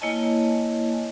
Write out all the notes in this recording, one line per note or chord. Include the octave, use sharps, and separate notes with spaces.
A#3 E4 C#5 D#5 G#5 A5